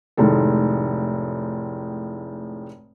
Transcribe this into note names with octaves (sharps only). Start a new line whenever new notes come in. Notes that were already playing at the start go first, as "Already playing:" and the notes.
F1 A2 D#3 G#3 A4